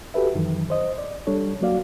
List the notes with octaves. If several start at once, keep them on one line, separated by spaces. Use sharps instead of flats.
F#4 G4 A4 B4 E5
F#2 D#3 E3 F#3
C5 D#5
D5
G3 D4 A4 C#5
F#3 A#3 F#4 D5 F5